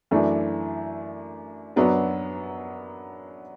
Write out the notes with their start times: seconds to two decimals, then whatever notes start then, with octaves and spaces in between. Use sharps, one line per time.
0.11 F#2 E3 A3 D4
1.76 F#2 F#3 B3 D4